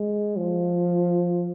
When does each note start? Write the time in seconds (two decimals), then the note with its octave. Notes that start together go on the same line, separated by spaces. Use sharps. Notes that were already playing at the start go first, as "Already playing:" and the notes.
Already playing: G#3
0.37 F3